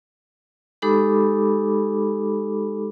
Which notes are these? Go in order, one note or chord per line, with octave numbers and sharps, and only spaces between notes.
G#3 D#4 G4 A4 B5 D6